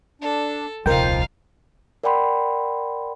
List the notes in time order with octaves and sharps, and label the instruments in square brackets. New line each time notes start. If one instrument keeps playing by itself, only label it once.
[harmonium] D4 [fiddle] A4
[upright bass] D#1 C2 [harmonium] F3 F4 [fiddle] D#4 F5 [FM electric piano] A#4 G5
[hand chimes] A#4 D5 F#5 G5 B5 C6